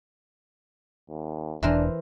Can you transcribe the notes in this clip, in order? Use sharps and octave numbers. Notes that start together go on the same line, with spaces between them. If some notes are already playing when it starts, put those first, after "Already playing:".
D#2
E1 E3 D4 A#4 C5